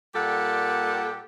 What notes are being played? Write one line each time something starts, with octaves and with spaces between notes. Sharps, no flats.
A#2 G3 A#3 G4 A4 F#5